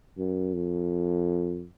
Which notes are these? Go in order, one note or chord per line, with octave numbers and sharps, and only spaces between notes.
F#2
F2